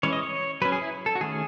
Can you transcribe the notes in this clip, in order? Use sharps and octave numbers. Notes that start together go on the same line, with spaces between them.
E3 G#3 C#4 C#5
D#5
C#5
F#3 C#4 B4
G#4
E4
A4
F#4
D#3 A3 C#4 G#4